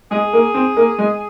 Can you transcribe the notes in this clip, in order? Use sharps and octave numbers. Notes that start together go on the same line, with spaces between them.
G#3 G#4
A#3
C4
A#3
G#3